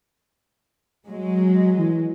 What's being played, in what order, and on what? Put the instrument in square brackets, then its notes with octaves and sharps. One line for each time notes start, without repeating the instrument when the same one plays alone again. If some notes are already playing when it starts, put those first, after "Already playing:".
[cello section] F#3 G#3
[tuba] E3